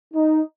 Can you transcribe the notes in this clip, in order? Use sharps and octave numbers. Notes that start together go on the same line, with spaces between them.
D#4